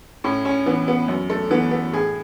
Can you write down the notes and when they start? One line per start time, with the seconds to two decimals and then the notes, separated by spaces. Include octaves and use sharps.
0.24 A2 C#4
0.45 C#4
0.66 E3 B3
0.88 B3
1.08 F#2
1.30 A3
1.50 E3 B3
1.71 B3
1.93 A2 G#4